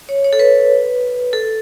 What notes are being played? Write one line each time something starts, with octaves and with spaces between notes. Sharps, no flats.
C#5
C#5
A4
B4
A4